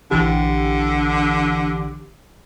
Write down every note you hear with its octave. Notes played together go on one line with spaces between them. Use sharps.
A#1 D3 E3 G4